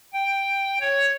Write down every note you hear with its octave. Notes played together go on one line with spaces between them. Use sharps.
G5
C#5